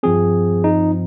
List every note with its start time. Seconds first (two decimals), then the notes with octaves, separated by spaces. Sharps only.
0.03 G2 F3 C4 G#4
0.64 D#4